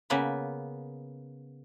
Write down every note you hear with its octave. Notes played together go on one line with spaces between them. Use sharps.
C#3 A#3 B3 B4